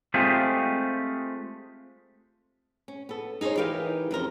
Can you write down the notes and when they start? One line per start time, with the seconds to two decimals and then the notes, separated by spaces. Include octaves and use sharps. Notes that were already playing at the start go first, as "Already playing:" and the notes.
0.14 G#3 A3 C4 F4 G4 G#4
2.88 C#4
3.09 B3 A4
3.41 D#4 G#4 A4 C5 C#5
3.57 E3 D#4 G4 A#4 B4 F5
4.11 F2 C#4 A#4 C5